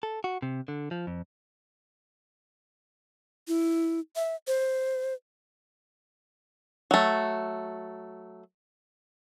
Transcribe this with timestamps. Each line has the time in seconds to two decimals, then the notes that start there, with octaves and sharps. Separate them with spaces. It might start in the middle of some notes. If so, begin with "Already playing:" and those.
0.03 A4
0.24 F#4
0.42 C3
0.68 D3
0.91 F3
1.07 F2
3.48 E4
4.16 E5
4.47 C5
6.91 F#3 A3